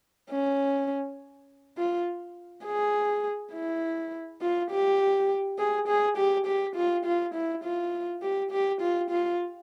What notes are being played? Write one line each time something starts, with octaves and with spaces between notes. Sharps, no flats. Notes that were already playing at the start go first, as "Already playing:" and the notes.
C#4
F4
G#4
E4
F4
G4
G#4
G#4
G4
G4
F4
F4
E4
F4
G4
G4
F4
F4